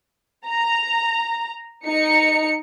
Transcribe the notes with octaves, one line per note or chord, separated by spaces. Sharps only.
A#5
D#4 C#7